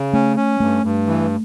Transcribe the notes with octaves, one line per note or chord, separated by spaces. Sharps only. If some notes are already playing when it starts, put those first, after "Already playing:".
Already playing: C#3
A3 C#4
C#4
G2 A3
G2
E3